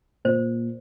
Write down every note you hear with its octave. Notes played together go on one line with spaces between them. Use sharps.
A#2 C5